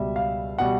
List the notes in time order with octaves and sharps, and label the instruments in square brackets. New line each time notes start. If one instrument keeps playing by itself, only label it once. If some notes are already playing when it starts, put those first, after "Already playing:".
Already playing: [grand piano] C#2 B2 G3 E5
F5
B2 G3 F#5